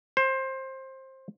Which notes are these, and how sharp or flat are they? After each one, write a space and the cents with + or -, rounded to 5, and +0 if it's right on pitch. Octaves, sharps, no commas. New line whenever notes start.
C5 +20